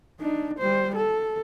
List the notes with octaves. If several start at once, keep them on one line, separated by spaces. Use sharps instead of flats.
D4 D#4
G3 C5
A4